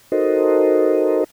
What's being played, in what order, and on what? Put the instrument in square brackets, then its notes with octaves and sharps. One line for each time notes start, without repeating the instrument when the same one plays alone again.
[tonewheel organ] D#4 F#4 A4 A#4 C5 D#5